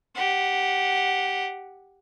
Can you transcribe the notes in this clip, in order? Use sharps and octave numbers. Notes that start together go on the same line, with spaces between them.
G4 F#5